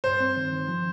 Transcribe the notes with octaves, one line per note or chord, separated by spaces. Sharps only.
G2 C5
C4
D#3
D#3
F3